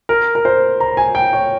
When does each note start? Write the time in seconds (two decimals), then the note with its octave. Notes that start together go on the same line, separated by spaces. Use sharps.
0.09 A#4
0.35 A#4
0.45 C5
0.80 A#5
0.97 G#5
1.15 G5
1.33 C#5